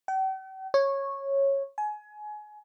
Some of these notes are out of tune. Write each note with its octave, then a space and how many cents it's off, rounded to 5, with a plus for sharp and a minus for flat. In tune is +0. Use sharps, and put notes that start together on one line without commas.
G5 -45
C#5 -10
G#5 +25